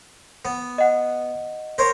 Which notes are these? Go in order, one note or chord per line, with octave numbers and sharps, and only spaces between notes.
B3
D#5 F#5
A#4 C5 C#5